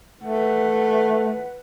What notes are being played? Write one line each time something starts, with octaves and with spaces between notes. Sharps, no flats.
A3 B4 F#5